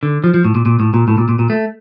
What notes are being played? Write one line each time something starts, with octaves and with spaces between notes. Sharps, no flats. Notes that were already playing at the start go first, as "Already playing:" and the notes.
D3
F3
F3
A2
A#2
A#2
A2
A#2
A2
A#2
A#2
A#2
A3